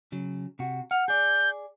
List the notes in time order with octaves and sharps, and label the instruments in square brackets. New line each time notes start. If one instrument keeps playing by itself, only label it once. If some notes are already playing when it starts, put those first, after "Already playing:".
[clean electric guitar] C#3 F#3
C3 F#4
[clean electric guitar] F#5 [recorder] F6
[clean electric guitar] G#4 D5 [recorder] G6